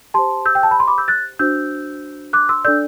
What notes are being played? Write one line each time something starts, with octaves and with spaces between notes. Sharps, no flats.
G4 C5 A5 C6
E6 G6
G5
A5
B5
C6
B5 D6
E6 G6
F#6 A6
D4 F#4 C5 E6 G6
D6 F#6
C6 E6
D4 A4 D5 E6 G6